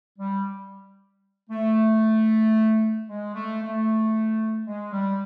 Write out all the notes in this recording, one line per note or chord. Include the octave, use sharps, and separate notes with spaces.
G3
A3
G#3
A3
A3
G#3
G3